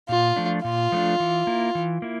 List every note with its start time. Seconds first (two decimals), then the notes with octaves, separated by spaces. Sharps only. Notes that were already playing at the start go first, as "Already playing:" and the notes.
0.09 A#2 F4
0.36 F3 A3 D4
0.64 A#2 F4
0.92 F3 A3 D4
1.20 E3
1.47 A#3 E4
1.75 E3
2.02 A#3 E4